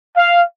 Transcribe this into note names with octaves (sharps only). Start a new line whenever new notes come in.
F5